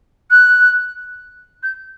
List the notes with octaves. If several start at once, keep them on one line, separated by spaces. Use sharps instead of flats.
F#6
G6